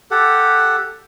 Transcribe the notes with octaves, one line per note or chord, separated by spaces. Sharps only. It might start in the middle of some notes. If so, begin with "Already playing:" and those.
G4 A4 F#5